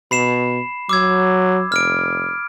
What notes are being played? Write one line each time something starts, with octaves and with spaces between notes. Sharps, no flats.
B2 B5 C7 E7
F#3 D6 E6 G#6
F1 F6 D7